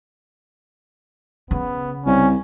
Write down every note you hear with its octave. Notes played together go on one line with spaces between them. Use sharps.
C#3 B3
C2 C#4